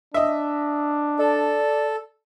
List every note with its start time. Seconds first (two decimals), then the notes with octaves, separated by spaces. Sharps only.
0.14 D4 D#5 E5
1.19 A4 D5